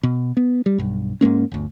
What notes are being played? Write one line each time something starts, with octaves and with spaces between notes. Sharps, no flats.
B2
B3
G3
B1 G2
G#2 G#3 A#3 C#4
G1 D2